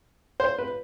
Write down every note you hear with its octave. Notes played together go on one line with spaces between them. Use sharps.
C5
B4